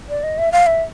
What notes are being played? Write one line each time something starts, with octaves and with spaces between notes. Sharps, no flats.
D5
D#5
E5
F5
E5